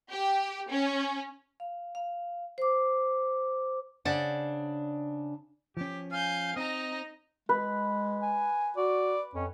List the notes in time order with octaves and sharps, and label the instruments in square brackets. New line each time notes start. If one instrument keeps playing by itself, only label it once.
[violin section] G4
C#4
[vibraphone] F5
F5
C5 D6
[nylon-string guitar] C#3 D4 C5 D5 F#5
[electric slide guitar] F3 C#4 [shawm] G4
[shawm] F5 [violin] G#5 G6
[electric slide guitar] C4 [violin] D#4 A#5 [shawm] D#5
[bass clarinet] G#3 [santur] B4
[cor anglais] G#5
[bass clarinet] F#4 [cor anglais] D5
[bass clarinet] F2 [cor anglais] C#4